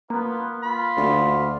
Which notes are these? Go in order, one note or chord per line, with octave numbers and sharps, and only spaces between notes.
A#3 B3 F4 B4
F4 B5
D2